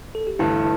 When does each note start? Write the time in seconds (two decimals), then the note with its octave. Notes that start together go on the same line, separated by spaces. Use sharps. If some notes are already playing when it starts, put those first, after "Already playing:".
0.15 A4
0.27 G4
0.39 G1 G2 E3 A3 E4